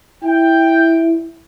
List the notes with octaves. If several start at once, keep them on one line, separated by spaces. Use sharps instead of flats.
E4 G5